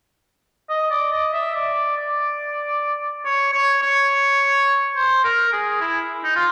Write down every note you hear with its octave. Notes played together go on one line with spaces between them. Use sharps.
D#5
D5
D#5
E5
D5
D5
C#5
C#5
C#5
C5
A#4
G#4
E4
D#4
F4